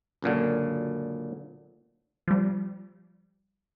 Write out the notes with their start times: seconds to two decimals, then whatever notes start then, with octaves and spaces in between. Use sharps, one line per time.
0.22 C#2 F#2 A#2 D3
2.28 F3 G3